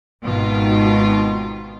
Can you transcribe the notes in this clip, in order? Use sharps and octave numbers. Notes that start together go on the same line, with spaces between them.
G#1 B2 D#3 F4